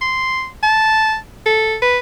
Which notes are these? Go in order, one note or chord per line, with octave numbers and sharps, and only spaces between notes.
C6
A5
A4
B4